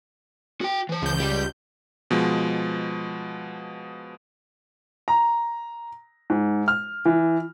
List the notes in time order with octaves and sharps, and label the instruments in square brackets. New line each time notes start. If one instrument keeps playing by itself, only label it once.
[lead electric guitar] F#4 G5
E3 C5
[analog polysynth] C#2 G6
[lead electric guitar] G3 G4
[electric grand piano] B2 F3 G#3
[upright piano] A#5
G#2
F6
E3